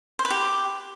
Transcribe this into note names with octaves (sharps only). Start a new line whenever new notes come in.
C5
B4
G4